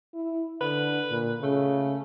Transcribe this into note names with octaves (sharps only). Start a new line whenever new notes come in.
E4
D3 B4
A#2
C#3 A3